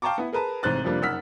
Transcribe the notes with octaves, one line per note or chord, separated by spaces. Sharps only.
F5 G5 A5 A#5 C#6 D6
B3 E4
G#4 A#4 B4 A5 A#5
A1 G#2 C3 C5 F#6 A6
F2 C3 F3 G3 A#3 D4
F#1 D#4 F#5 E6 F6 B6